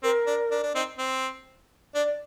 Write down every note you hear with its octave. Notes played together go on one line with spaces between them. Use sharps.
C4 A#4
D4
D4
D4
C4 D#4
C4
D4 D5